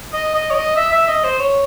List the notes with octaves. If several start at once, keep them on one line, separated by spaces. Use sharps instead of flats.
D#5
D#5
C#5
D#5
E5
E5
D#5
C5
C#5